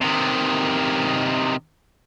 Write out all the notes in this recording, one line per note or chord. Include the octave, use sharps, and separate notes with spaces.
C3 D#3